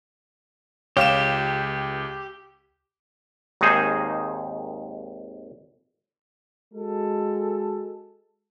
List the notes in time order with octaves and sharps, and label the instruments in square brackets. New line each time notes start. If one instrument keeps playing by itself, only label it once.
[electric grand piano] C#2 E7 [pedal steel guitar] G4 [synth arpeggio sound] C#5 F5
[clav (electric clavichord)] G#1 D#2 D#3 D#4 G#4 C5
[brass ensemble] G#3 F#4 A4